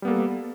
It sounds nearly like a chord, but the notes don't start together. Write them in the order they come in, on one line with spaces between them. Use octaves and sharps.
G3 B3 A#3 A4